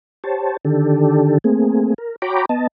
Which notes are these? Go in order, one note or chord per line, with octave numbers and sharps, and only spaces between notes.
G4 C5 C#5 A5
D3 D#3 D4 G4 A4
A3 A#3 C4 G#4
A#4
F#4 C#5 G5 A#5 B5 D6
B3 D#5 A5